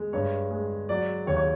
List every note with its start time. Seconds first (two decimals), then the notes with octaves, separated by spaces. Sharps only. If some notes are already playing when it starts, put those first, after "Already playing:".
Already playing: G#3
0.13 G2 C#5
0.51 G#3
0.89 F#3 D5
1.27 D#2 C#5
1.37 C#5